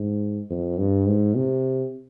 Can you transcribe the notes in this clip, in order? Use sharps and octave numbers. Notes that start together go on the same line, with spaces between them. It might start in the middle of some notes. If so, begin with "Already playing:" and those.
Already playing: G#2
F2
G2
G#2
C3